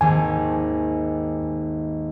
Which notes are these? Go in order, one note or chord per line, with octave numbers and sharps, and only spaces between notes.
G#1 D#2 G#5